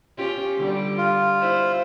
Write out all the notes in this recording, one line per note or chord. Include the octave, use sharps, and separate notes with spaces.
C#4 F4 G4
D3 G3
F4
E4 C5